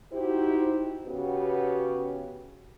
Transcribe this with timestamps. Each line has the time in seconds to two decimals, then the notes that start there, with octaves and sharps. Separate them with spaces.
0.13 D#4 E4 F#4 G4 C5
1.06 C#3 B3 F#4 G4 B4